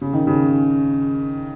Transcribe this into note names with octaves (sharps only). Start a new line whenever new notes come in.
C#3
D#3
C#3